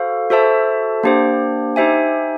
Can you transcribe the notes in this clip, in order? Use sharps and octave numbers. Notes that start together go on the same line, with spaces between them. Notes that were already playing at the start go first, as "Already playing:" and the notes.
Already playing: F#4 A4 C5 F5
F#4 A4 C5 E5 A5
A#3 D4 G4 C5
D#4 G4 C5 E5 G#5